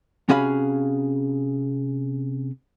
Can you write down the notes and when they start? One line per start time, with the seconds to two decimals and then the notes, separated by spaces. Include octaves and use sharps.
0.29 C3 C#4 F#4 G#4 F5 B5